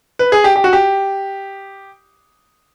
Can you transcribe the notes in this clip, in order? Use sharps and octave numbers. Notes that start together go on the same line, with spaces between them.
B4
G#4
G4
G4
F#4
G4